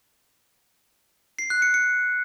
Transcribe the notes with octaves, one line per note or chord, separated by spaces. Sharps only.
C7
F#6
C#7
C#7